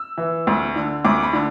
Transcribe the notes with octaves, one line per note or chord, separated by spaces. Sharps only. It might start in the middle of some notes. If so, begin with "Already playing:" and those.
Already playing: E6
E3
D2
D3
D2 D6
B5
D3